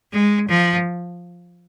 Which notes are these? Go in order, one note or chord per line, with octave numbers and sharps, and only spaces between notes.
G#3
F3